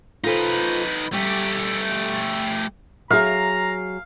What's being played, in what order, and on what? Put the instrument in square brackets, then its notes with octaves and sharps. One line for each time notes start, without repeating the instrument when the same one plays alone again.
[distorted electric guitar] D#4 B4 [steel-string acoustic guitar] F4 A4 C5
[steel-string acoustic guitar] G3 [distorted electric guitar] A3 G4
[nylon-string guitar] F#3 G#4 [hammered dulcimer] F5 [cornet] A#5